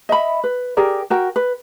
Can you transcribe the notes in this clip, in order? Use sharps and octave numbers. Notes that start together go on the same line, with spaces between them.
D#5 E5 B5
B4
G4 G#4 A#4 D5
F#4 A#4 G5
B4